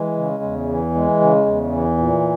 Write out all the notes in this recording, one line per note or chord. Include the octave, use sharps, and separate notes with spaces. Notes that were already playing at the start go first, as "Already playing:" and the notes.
Already playing: E3 G#3
C#3
E2
E3
G#3
C#3
E2
E3
A#2